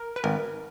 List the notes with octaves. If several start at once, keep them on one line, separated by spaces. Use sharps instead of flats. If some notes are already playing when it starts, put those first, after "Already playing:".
Already playing: A#4
B4
G#1 A#4